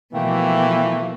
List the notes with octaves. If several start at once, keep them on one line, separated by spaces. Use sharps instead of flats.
B2 E3 F3 A3 A#3 G5